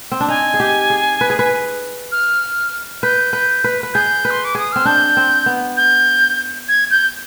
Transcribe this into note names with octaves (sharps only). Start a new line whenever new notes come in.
C4
D4
D#4 G#5
G#4
G4
G#4
B4
G#4
B4
F6
B4 G6
B4
B4
B4
G#4 G6
B4
C6
D6
G#4 D#6
C4 F6
D4 G6
C4
B3
G6
G#6
G6